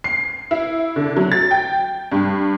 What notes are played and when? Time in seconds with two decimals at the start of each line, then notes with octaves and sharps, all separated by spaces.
0.04 C7
0.51 E4
0.96 D3
1.16 F#3
1.32 A6
1.51 G5
2.12 G2